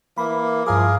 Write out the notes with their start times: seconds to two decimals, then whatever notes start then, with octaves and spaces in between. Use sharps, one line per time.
0.18 E3 A#3 B5
0.67 G2 F3 G#4 A#4 F5 D6